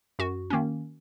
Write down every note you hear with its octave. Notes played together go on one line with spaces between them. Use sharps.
F#2 F#4
D#3 A#3 C#4